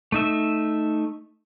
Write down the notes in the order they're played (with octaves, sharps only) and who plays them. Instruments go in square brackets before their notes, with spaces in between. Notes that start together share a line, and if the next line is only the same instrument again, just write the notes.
[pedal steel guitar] A3 D#4 E5